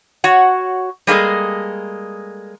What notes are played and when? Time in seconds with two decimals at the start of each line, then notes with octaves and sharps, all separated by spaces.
0.24 F#4 C#5 F#5
1.07 G3 G#3 A#3 G#4 A4